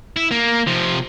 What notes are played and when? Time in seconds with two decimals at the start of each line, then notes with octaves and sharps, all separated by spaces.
0.17 E4
0.31 A#3
0.67 C3 F3